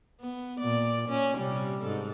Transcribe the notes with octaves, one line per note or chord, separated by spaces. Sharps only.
B3
A#2 D5
A#2 C#4
C3 G3
G#2 A4